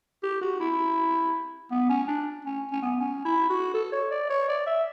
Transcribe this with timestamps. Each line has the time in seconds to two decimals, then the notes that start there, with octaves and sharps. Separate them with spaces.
0.23 G4
0.41 F#4
0.60 E4
1.71 B3
1.89 C#4
2.08 D4
2.45 C#4
2.71 C#4
2.82 B3
3.00 C#4
3.25 E4
3.49 F#4
3.74 A4
3.92 C#5
4.11 D5
4.29 C#5
4.48 D5
4.66 E5